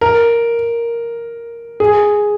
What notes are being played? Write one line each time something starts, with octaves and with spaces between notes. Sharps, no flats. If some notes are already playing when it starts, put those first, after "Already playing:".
A#4
G#4